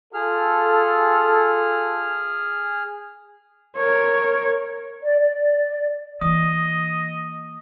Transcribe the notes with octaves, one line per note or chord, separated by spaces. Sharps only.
F4 G#4 A4 F6
A#4 C#5
D5
D5
E3 A#3 D#5 D#6